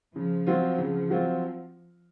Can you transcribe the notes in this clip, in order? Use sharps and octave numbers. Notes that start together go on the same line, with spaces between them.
C#3 F3
F#3 C4 F4
C#3
F#3 C4 F4